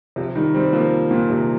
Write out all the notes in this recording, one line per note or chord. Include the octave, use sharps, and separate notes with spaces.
C3 F3
D#3 G3
G3 C4
F3 A#3
A#2
C3